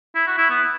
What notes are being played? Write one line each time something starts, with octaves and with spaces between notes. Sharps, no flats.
E4
F#4
E4
B3